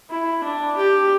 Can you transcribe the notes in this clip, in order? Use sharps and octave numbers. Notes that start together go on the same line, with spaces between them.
E4
D4
G4